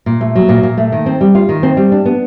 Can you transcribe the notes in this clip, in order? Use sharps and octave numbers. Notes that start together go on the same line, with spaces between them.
A#2
A3
F#3
A#2
A#2
A3
D#3
C4
G3
F4
D#3
C4
G3
D4
B3